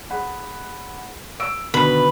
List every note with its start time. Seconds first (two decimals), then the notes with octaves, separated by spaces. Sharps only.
0.10 G#4 F#5 B5
1.40 E6 D7
1.74 B2 D3 D#3 B4